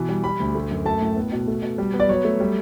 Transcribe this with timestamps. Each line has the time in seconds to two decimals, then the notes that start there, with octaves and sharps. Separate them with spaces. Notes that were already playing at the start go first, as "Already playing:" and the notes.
Already playing: B2 E3
0.09 G3
0.24 G3 B5
0.40 D2
0.55 A3
0.71 F#2
0.85 A3 A5
1.01 A2
1.16 B3
1.32 B2
1.48 A3
1.62 B2
1.78 G3
1.94 B3
2.00 D5
2.09 F#3 C#5
2.25 A3
2.40 G3